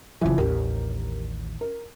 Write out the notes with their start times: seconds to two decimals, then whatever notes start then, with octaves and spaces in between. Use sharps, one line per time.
0.21 F#1 C#3 E3 F3
0.38 A1 D#2 G4 A#4
1.61 A#4